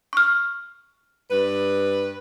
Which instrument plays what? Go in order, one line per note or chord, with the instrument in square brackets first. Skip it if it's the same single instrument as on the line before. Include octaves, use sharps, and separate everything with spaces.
[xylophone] C#6 F6
[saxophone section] G2 B4